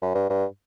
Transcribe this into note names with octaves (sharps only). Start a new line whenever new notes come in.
F#2
G2
G2